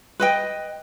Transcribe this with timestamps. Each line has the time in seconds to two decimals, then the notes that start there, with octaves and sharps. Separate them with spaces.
0.20 B4 D#5 G5